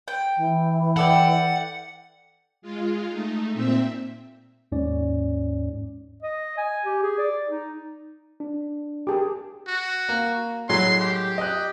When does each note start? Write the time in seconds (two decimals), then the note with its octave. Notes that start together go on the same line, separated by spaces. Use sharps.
0.08 G5
0.36 E3
0.97 A4 D5 F#5 G5
2.62 G#3 F4
3.09 A3 D#4
3.54 A#2 C4 E5
4.72 D#2 G#2 C#4 D5
6.23 D#5
6.58 G#5
6.86 G4
7.03 G#4
7.18 D5
7.49 D#4
8.40 D4
9.07 G4 G#4 A#4 A5 D6
9.68 F#4
10.09 A#3
10.69 A2 F#3 G#3 C6
11.00 G4
11.38 D#5 F#6